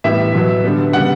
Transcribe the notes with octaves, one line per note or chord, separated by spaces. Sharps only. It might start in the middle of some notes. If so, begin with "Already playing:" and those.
A2 E3 G3 B3 E5
B2 F#3 B3
D3 G3 B3
C#3 G3 B3 F#5